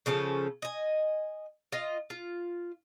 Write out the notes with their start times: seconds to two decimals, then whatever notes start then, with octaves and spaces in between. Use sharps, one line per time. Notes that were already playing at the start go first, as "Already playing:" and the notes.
0.06 C#3 F3 C#4 A4
0.62 D#5 G#5
1.72 F4 D#5
2.10 F4